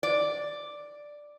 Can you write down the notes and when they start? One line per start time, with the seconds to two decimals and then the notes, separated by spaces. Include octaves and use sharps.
0.03 D5